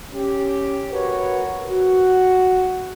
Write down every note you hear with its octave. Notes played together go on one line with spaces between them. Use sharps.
C#4 G4
F#4 A#4 B4 C#5
F#4